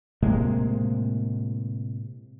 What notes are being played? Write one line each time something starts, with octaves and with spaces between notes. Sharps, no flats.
A2 C3 G#3 A#3